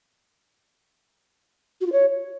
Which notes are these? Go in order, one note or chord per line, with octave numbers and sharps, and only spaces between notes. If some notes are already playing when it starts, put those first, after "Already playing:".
F#4
F4
C#5